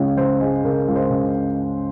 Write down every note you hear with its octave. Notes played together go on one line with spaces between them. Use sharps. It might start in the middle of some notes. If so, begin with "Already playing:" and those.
Already playing: C#2 C#3 C#5
C#3 C5
G#3
C#3 A#4
C#2
C5
C#3